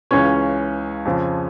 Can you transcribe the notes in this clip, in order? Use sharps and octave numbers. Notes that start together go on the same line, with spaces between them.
C#2 C#3 E3 C#4 C#5
F2 C#3 F3